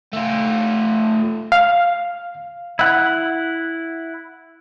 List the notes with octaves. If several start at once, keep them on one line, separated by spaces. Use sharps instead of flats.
A3 F4
F5
E4 F#5